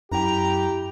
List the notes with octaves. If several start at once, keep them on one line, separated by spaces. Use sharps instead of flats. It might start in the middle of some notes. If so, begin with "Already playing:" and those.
F#2 E4 G4 G5 A#5